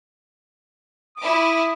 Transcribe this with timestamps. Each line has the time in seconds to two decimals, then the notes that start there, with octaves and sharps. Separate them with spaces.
1.17 E4 D6 D#6